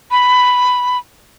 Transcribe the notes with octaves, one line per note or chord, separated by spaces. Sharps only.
B5